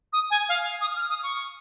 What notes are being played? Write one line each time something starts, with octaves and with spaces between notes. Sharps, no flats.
D#6
G#5
F5
D#6
F6
D#6
C#6